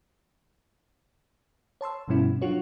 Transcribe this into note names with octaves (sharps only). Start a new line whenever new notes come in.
C#5 A5 C6 E6
G2 B2 F3 G3 C#4 E4
F#3 D4 F4 F#4 C#5